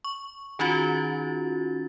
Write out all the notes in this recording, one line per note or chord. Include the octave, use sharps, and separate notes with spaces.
C#6
D#3 C#4 D#4 F4 F#4 A6